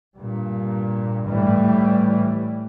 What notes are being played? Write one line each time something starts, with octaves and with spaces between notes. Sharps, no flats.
G2 A#2
A2 E3 G3